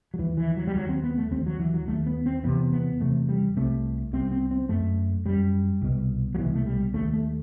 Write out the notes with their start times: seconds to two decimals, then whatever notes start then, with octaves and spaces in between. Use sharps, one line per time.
0.14 F#3
0.19 D#2 E3
0.37 E3
0.57 F#3
0.67 G3
0.75 D#2 F#3
0.89 C4
1.04 B3
1.18 A3
1.31 D#2 C4
1.46 F#3
1.59 E3
1.74 F#3
1.88 D#2 A3
2.07 B3
2.26 C4
2.44 E2 C3 B3
2.73 B3
3.00 E2 C3 A3
3.29 G3
3.57 C2 C3 A3
4.13 C2 C3 C4
4.32 C4
4.51 C4
4.69 F#2 A3
5.25 F#2 G3
5.82 C2 B2
6.35 F#3
6.38 C2 B2 E3
6.55 A3
6.66 G3
6.94 D#2 A3
7.14 A3